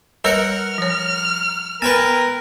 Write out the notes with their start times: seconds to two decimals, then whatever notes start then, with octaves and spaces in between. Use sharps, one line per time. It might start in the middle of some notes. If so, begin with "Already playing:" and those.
0.24 G3 A#4 B4 C#5 F#5 F6
0.78 F3 C#5
1.82 B3 A#4 B4 G5 G#5